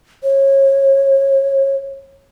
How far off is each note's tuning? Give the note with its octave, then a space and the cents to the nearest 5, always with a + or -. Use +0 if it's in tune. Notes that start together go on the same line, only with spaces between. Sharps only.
C#5 -25